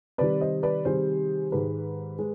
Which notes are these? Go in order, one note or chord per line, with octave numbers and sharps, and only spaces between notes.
C3 D#3 G3 B4 D5
C5 D#5
B4 D5
C3 D#3 G3 G#4 C5
G#2 D#3 G#3 G4 B4
G#3